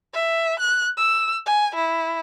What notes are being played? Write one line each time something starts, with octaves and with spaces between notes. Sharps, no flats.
E5
F#6
E6
G#5
E4